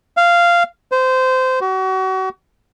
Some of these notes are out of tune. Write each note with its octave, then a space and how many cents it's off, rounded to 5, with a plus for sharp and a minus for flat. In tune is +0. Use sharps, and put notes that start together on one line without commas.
F5 -10
C5 -20
F#4 +35